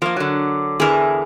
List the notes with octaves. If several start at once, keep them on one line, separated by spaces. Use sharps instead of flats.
F3 A#3 A#4
D3 F#3
E2 D3 E3 G#4 A#4